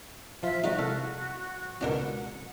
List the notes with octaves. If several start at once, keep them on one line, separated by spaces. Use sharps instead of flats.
F3 F4 E5
G3 G#3 D#4 F#4
C2 A4 F5
C#2 B2 C#4 D4 F#4 A#4 F#5